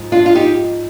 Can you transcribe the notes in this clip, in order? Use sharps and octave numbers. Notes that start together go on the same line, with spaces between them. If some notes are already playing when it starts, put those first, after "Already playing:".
Already playing: G#2 F3
D4 F4
F4
D#4 G4